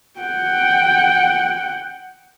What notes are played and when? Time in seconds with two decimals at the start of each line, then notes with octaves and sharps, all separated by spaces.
0.19 F#5 G5